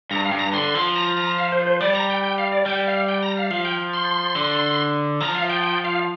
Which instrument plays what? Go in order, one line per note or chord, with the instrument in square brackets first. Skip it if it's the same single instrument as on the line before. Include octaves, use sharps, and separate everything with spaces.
[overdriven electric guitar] G2 [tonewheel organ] A#5
[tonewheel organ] F5
[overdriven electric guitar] G2
[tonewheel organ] A#5
[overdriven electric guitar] D3 [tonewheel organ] C6
[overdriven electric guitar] F3
[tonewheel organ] A#5
A#5
F5
C5
C5
[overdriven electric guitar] G3 [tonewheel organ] D5
[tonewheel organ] A#5
G5
G5
F5
D5
[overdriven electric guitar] G3 [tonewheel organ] G5
[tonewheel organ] F5
G5
A#5
F5
[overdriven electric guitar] F3 [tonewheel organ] F5
[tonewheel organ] G5
C6
[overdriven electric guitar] D3
[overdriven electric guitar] F3 [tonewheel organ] A#5
[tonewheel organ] F5
G5
G5
F5